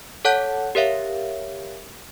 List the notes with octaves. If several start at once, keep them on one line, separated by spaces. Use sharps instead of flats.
A4 C#5 F#5 A5 F#6 G6
G4 A#4 C#5 E5 F5